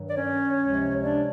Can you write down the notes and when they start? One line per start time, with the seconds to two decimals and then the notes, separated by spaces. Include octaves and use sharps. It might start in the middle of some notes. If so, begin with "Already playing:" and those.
Already playing: G2 D#3 F#3
0.09 D5
0.15 C#4 C#5
0.59 C#2 C3 F3 G#3
1.02 D4 D5